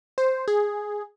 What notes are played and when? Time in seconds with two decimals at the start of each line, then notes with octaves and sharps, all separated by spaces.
0.18 C5
0.48 G#4